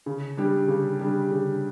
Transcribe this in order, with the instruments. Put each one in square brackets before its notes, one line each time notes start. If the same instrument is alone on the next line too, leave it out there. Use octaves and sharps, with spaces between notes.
[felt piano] C#3
G3 D4 G4
C#3
G3 D4 G4
C#3